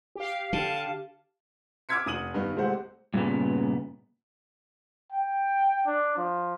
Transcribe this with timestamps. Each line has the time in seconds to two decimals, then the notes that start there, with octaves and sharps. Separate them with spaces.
0.16 G4 F5
0.53 D3 A5
1.89 D6 E6 F6 G#6 B6 C#7
2.06 F1 D#6 D#7 F#7
2.34 G2 D#3 B3
2.56 C2 G#3 A3 G4 C5 F#5
3.14 G2 A#2 C#3 B3
5.12 G5
5.86 D4
6.18 F3